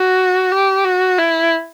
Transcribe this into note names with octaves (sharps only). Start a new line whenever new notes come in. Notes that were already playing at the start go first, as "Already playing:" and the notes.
Already playing: F#4
G4
F#4
E4